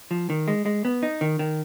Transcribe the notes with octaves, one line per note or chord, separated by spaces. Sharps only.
F3
D#3
G#3
G#3
B3
D#4
D#3
D#3